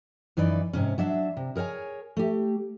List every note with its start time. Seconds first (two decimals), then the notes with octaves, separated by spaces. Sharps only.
0.37 F#2 E3 D#4 B4 D5
0.73 G#2 C3 C#4
0.98 F#3 D4 E5
1.37 C3
1.56 G#4 A#4 C5 C#5 G#5
2.17 A3 G4